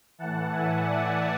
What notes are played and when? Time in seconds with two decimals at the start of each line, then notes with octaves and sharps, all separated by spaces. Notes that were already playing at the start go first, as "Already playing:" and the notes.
0.18 A2 E3 F#5 A5
0.51 E5 G#5
0.83 D5 F#5